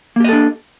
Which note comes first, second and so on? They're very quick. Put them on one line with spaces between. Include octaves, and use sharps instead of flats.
A#3 G4 D#5 A4 D4